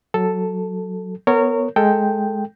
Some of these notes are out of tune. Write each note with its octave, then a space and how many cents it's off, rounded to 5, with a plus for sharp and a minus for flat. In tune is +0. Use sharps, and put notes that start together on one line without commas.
F#3 +0 A4 +0
B3 +0 A#4 -25 C#5 +0
G#3 +15 A4 +15 G5 +0